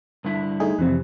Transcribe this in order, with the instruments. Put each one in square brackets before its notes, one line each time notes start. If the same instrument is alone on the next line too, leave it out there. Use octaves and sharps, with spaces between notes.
[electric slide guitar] G2 D3 E4
[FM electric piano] A3 D#4 G#4
[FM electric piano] F2 C3 [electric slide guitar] E3 C4